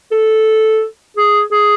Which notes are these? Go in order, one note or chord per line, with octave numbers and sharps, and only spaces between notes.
A4
G#4
G#4